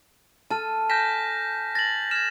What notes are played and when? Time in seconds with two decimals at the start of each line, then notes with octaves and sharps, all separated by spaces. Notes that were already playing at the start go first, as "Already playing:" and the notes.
0.50 A4 A5 F6 D#7
0.90 G#5 F6 G6 A#6 B6 E7
1.75 A6 A#6 F#7
2.11 F6 G#6 E7